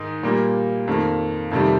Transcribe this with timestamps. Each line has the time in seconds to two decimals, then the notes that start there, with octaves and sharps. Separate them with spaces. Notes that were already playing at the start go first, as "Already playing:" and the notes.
Already playing: G#2 D#3 D#4
0.23 A#2 G3 A#3
0.87 F2 D#3 A#3
1.51 F2 C3 D#3 G3